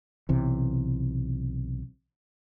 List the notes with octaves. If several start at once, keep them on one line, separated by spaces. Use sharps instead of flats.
B1 C3 E3